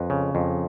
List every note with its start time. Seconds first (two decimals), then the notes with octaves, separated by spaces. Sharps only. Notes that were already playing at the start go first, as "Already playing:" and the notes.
Already playing: F2 B4
0.10 C#3
0.35 F2